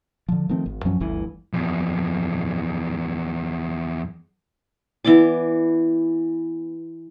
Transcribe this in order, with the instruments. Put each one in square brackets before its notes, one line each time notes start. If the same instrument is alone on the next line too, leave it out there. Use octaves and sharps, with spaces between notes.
[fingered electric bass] D3 F3
D#3 F3 A3 C4
G#1
F#2 F3 F#3 C#4
G1 D2 G2 E3
[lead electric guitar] E2 F3
[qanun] E3 B3 D5 D6